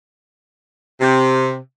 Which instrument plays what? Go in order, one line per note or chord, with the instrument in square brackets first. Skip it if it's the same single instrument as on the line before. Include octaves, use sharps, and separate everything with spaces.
[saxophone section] C3